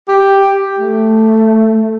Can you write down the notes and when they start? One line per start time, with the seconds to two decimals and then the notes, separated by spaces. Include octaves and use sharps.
0.08 G4
0.79 A3